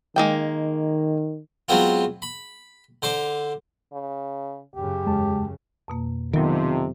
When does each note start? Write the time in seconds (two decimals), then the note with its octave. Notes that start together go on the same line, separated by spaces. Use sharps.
0.16 D#3 G#3 A#3 G5
1.69 F#3 G#3 B3 C4 F4
2.22 B5
3.02 D3 C5 D6
3.93 C#3
4.75 F#2 C#3 G4
5.06 E2 G#3 A5
5.88 F2 B2 A#3
6.33 F2 C3 D#3 F#3 B3